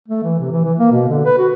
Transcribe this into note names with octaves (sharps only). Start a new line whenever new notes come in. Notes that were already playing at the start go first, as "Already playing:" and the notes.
A3
E3
C3
E3
E3
A#3
B2
D3
B4
F#4